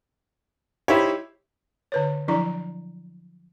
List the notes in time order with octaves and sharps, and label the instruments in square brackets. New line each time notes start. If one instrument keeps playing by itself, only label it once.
[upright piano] D#4 C5 C#5 [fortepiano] E4 G4
[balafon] D3 B4 C#5
F3 F#3 D4 E4 D5 A#5